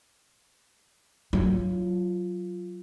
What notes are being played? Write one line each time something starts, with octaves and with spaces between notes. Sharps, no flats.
F#3 F4